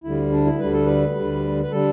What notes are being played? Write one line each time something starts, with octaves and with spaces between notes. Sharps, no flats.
D2 D3 G3 E4
D4
E4
D2 D3 G3 B4
A4
B4
D2 D3 G3
B4
D3 G3 A4